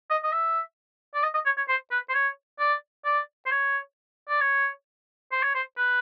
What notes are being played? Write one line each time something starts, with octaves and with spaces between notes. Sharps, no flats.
D#5
D#5
E5
D5
D#5
D#5
C#5
C#5
C5
B4
C5
C#5
D5
D5
C5
C#5
D5
C#5
C5
C#5
C5
B4